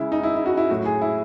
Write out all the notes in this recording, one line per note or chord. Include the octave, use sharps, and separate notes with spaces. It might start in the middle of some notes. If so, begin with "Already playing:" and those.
Already playing: C#3 G#3 E4
D#4
E4
E4
F#4
E4
A2 F#3 A3 F#4
G#4
E4